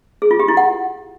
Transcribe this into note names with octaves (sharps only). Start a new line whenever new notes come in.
G#4
F4
G4
E4
F#5